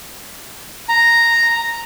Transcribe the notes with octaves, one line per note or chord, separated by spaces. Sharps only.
A#5